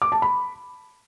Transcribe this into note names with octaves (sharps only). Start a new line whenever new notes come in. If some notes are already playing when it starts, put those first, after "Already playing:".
D6
A5
B5